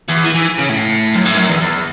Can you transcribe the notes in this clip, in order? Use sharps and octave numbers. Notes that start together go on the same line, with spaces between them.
E2
E3
E3
C#3
A2
F#2
A2
F#2
E2
E2